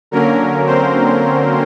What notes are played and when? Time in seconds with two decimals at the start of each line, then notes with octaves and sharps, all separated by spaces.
0.11 D3 F#3 A#3 C#4 A#4
0.66 C4 C5